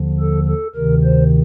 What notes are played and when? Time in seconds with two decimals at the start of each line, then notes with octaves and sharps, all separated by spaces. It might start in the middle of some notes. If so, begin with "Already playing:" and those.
Already playing: D#2 D3 F3
0.20 A4
0.48 A4
0.75 D2 C3 D#3 A#4
1.04 C5